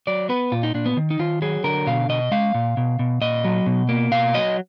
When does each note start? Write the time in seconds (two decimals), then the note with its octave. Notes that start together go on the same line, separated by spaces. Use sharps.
0.07 F#3 D5
0.29 B3 B4
0.52 A#2 F4
0.63 D#4
0.74 A#2 D4
0.86 B3
0.97 D#3
1.10 D#4
1.19 D#3 F4
1.42 F#3 G#4
1.64 D3 A#4
1.87 B2 F5
2.09 B2 D#5
2.32 G#3 F5
2.54 A#2
2.77 B2
2.99 B2
3.21 A#2 D#5
3.44 F#3
3.66 B2
3.89 A#3
4.11 B2 F5
4.34 F#3 D#5